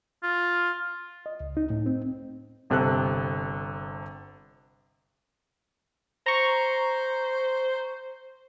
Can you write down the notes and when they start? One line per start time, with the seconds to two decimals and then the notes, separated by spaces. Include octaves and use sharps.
0.23 F4
1.26 D#5
1.40 C#2
1.57 D#4
1.70 A2
1.86 C4
2.70 G1 C3 A4 F#6
6.26 C5 A#5 C#6